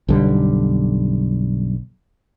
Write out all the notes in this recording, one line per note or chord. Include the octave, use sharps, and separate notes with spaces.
B1 F#2 D3 G3